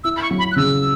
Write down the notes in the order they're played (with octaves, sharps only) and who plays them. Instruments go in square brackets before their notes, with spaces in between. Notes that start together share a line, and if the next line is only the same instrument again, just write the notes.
[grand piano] E4 [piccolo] E6
[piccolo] B5
C#6
[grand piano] F#3
[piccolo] B5
F#6
[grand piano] C#3 [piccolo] E6